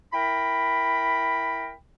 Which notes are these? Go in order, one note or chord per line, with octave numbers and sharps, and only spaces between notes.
E4 A#4 G5 B5